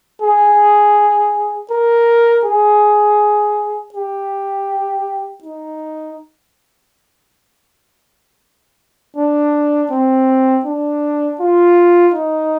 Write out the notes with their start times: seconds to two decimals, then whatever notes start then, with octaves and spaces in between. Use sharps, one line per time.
0.22 G#4
1.70 A#4
2.45 G#4
3.94 G4
5.44 D#4
9.17 D4
9.91 C4
10.66 D4
11.40 F4
12.14 D#4